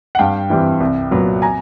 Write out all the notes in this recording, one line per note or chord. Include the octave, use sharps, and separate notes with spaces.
F#5
G2 F5 G5
E3 G3 C4 E4
C2
A#2 F#3 B3
G#5 A#5